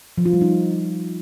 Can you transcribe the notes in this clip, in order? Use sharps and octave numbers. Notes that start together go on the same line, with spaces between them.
F3
F4
G3
D#4